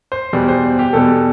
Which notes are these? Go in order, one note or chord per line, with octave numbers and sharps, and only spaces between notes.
C5
E2 B2 G3
C5
G4
E2 B2 G3 A4